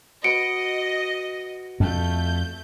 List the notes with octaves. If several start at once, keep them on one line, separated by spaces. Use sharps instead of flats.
F#4 B4 D#5 C#7 D7
F2 A3 G6